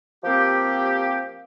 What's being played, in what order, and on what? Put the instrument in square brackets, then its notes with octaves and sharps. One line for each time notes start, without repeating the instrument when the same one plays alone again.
[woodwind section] F3 A#3 C4 G4